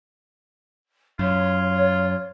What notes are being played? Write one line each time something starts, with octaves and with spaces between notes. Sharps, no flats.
F#2 F4 C#5